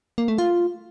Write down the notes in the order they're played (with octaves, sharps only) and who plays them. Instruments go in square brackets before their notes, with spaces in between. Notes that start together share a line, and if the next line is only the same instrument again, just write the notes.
[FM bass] A#3
A3
F4